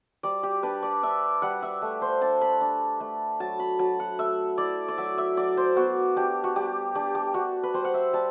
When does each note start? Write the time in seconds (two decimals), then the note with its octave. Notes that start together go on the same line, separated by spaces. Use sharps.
0.23 G3 D5
0.43 G4
0.63 D4 B4
0.83 D5
1.03 D4 E5
1.42 G3 F#5
1.62 E5
1.82 A3
2.02 C5
2.21 D4 A5
2.41 B5
2.61 D4
3.00 A3
3.40 F#3 A5
3.59 B5
3.79 F#3 A5
4.00 F#5
4.19 A3 E5
4.58 E4 D5
4.88 D5
4.98 F#3 E5
5.18 E5
5.37 F#3 D5
5.57 C5
5.76 B3 F#4
6.16 D4 G4
6.44 F#4
6.56 G3 G4
6.95 D4 G4
7.15 G4
7.34 D4 F#4
7.63 B4
7.74 G3 C5
7.85 F#5
7.94 E5
8.13 G3 A5